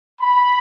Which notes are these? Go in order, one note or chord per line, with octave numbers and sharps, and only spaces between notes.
B5